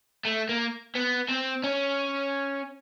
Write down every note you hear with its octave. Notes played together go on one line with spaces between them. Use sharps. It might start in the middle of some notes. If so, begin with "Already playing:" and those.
A3
A#3
B3
C4
C#4